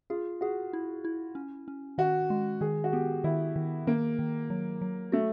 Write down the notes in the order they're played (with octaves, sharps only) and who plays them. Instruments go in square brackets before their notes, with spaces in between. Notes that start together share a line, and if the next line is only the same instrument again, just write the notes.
[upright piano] F4 [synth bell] G#4
[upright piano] F#4 [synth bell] G#4
[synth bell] E4
E4
C#4
C#4
[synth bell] D#3 [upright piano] F#4
[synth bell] G#3
[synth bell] D#3 [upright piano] G#4
[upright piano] F#4
[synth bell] B3 [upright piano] G4
[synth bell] D#3 [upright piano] E4
[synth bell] D#3
[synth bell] D#3 [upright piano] A#3
[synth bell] D#3
F#3
F#3
[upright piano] A3 [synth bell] F#4